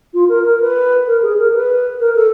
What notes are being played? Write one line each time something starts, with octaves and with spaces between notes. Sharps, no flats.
F4
A#4
A#4
B4
A#4
G#4
A#4
B4
A#4
A4